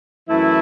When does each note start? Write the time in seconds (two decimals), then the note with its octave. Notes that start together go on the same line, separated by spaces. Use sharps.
0.29 F#2 E3 A3 E4